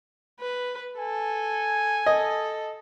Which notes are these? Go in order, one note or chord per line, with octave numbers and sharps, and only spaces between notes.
B4
A4 G#5
A4 D#5